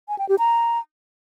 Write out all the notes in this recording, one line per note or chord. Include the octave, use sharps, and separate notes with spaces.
G#5
G5
G4
A#5